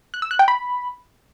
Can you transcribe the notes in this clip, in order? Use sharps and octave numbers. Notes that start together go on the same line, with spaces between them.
F#6
E6
F#6
G5
B5